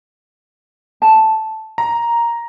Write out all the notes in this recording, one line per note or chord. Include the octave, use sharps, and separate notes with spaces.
A5
A#5